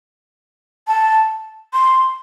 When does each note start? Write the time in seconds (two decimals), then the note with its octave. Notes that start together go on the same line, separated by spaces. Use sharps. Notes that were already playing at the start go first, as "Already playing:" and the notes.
0.87 A5
1.73 C6